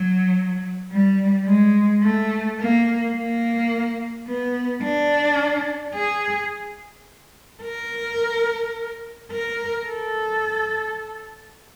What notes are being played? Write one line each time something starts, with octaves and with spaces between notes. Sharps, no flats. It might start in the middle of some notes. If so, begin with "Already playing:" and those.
Already playing: F#3
G3
G#3
A3
A#3
A#3
B3
D4
G#4
A#4
A#4
A4